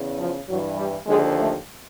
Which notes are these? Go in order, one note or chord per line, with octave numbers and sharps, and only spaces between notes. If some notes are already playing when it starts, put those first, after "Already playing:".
Already playing: E2 C#3
F3
G2 E3 F#3
G3
D#2 D3 F3 G#3
A3